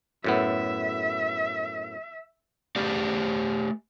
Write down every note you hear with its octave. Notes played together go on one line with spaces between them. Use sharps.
F#2 A2 B3 E5
A3 G4 D5 F5